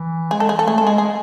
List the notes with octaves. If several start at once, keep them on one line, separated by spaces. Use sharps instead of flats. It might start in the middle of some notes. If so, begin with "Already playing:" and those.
Already playing: E3
G#3 G#4
A4
G#4
A4
A3 G#4
A4
G#3 G#4
G#3 G#4